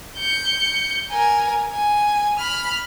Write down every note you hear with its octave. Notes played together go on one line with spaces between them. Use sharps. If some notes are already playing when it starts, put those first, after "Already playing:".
G6 C#7
A#4 G#5
G#5
B5 F6